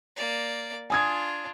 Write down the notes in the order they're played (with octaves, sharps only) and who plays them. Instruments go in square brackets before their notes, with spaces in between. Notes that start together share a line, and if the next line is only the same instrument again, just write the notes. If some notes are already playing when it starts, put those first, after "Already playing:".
[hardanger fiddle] A#3 D5
[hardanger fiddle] D4 F4 [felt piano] G#5 D#6 G#6